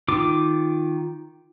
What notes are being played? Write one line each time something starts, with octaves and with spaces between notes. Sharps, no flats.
D#3 F4 D6